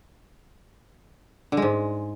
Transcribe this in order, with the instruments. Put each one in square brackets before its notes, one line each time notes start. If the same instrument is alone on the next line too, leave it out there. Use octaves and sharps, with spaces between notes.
[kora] D3
G#3
G#2